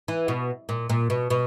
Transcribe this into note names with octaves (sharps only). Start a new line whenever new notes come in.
E3
B2
A#2
A#2
B2
B2